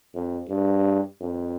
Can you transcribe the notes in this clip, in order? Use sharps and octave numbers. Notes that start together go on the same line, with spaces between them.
F2
G2
F2